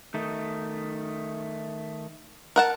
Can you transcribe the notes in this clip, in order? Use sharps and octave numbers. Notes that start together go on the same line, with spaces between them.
D#3 A3 D#4
A#4 F#5 A5